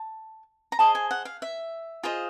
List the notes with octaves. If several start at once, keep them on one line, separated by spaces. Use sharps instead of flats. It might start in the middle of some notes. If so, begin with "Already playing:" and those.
Already playing: A5
A#5
G#4 C5 D#5 A5
G#5
F#5
F5
E5
F4 G#4 C5 D#5